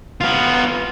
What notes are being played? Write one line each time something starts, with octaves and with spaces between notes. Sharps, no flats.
B3 F4